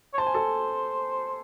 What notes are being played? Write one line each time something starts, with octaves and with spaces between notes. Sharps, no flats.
C#5
C5 A5
G#5
A4 A5